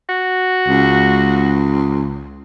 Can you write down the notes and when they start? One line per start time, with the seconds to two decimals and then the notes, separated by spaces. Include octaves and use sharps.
0.09 F#4
0.68 C#2